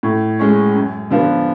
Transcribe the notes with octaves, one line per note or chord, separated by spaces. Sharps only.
A2
G#3 C#4
F#2
D3 F3 B3